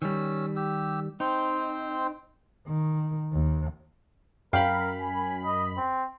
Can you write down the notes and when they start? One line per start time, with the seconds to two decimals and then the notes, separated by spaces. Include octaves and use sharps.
0.02 D#3 G3 C#4 E6
0.56 G4 E6
1.20 C4 D#4 C5 G5
2.67 D#3
3.33 D#2
4.53 F#2 A#4 F5 G5 B5
5.01 G#5
5.45 D#5
5.77 C4